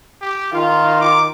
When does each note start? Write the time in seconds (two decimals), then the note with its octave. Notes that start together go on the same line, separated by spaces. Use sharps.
0.22 G4
0.54 D#3 F4 F5
1.01 D6